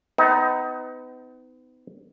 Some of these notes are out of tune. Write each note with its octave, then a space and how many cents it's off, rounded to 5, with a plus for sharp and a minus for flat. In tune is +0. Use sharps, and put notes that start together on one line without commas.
B3 +40 D#4 +20